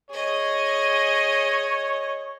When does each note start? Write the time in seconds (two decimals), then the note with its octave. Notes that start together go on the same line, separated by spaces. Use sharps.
0.10 G#4 C#5 D#5